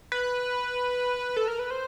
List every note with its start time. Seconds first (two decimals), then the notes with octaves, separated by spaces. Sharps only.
0.12 B4
1.36 A4
1.48 A#4
1.59 B4
1.71 C5